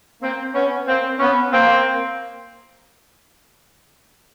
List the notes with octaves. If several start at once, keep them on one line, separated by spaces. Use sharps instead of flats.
A#3 C4
B3 C#4
A#3 C4
B3 C#4
A#3 C4